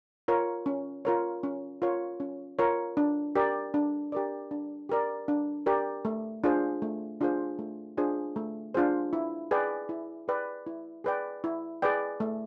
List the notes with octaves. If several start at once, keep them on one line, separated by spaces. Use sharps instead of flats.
F4 A#4 C#5
C#4
F4 A#4 C#5
C#4
F4 A#4 C#5
C#4
F4 A#4 C#5
D4
G4 A#4 D5
D4
G4 A#4 D5
D4
G4 A#4 D5
D4
G4 A#4 D5
A3
D4 F4 G#4 C5
A3
D4 F4 G#4 C5
A3
D4 F4 G#4 C5
A3
D4 F4 G#4 C5
E4
G#4 B4 D5 G5
E4
G#4 B4 D5 G5
E4
G#4 B4 D5 G5
E4
G#4 B4 D5 G5
A3